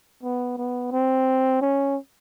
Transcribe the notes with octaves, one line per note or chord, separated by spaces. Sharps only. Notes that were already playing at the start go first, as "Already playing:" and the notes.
B3
B3
C4
C#4